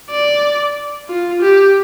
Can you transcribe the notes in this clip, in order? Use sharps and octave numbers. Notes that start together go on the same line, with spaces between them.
D5
F4
G4